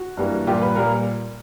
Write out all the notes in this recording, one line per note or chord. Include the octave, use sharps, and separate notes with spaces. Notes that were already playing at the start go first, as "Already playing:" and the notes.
Already playing: F#4
G2 E3 G3 A#3
A#2 G3 A#3 F4 G4
B4
A#2 G3 A#3 A#4